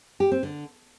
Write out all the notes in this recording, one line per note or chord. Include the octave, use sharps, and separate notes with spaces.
G4
C4
D3